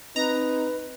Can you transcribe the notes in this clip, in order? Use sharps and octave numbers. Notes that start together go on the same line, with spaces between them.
C4 D#4 B4 A#5